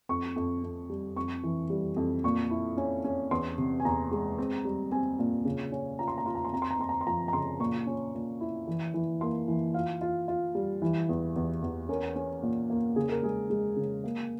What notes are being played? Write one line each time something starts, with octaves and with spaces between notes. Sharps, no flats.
F2 C#6
F2
F2
G3
F2 C#6
E3
G3
F2
A#2 C#6
E4
C#4
C#4
E2 C6
C3
G#5
E2 A#5
G#3
C4
G3
C4 G#5
A#2
C#3
C#4
F4 A#5
C6
A#5
F4 C6
A#5
C6
C4 A#5
C6
A#5
C4 C6
A#5
C6
F3 A#5
A#5
C#3 C6
A#2 C#6
C#4
A#2
E4
E3
E3
A#3 C6
E3
F4 F5
F4
F4
G3
E3
E2
E2
E2
C#4 A#4
C#4
A#2
A#3
C#3 G#4
A#4
G#3 G#4
G#3
C#3
A#3